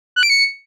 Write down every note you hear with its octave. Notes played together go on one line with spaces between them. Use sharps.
F#6
D7
C#7